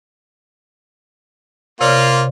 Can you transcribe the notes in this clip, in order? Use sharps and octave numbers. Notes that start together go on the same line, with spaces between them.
C3 A#3 F4 C#5 D5